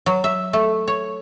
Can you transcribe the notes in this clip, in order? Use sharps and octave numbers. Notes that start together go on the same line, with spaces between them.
F#3
E5
A3
C#5